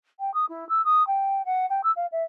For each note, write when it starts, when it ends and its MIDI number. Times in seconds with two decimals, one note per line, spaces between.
0.20 0.33 79
0.34 0.45 87
0.49 0.67 64
0.69 0.82 88
0.84 1.05 87
1.07 1.45 79
1.45 1.66 78
1.70 1.81 79
1.83 1.91 88
1.96 2.06 77
2.12 2.23 76